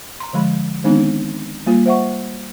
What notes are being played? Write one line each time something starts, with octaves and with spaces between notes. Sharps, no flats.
A#5 C6
D3 F3 G#3 B5
D#3 G#3 B3 C4 D4 D#4
G3 A#3 F4
C5 E5 F#5 C#6